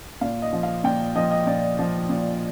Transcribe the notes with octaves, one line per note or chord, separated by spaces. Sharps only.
A#2 F5
D#5
F3
F5
A#2 G5
F3 D#5
D#5
A#2 D5
F3
A#2